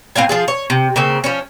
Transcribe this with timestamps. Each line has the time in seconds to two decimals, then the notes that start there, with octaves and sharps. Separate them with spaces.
0.16 A2 C4 F5 G#5
0.29 F3 F4 G#4
0.48 C#5
0.70 C3
0.96 C#3 A#3 C4
1.24 F3 C#4